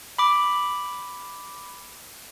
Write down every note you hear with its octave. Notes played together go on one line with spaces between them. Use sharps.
B5 D6